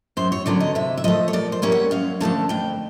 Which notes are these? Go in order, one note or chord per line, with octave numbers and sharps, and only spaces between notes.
F#2 C5
C#5
D3 F#3 B3 D5
D#5
C3 E5
E5
F3 A3 D#5
C#5
A#2 D5
C5
G3 A#3 C#4 E4
F#5
F#2 F5
D3 F3 A3 C#4 A5
F2 G5